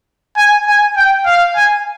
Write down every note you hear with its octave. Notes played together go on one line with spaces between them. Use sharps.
G#5
G#5
G5
F5
G#5